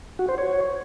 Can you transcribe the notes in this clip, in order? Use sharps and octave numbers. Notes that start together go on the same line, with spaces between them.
F#4
C5
C#5